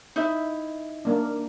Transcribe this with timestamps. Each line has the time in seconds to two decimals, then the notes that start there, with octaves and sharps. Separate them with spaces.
0.16 D#4 E4 E5
1.05 A#3 D4